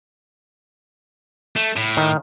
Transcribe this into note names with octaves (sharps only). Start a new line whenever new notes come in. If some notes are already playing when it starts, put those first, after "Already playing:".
A3
A2
D#3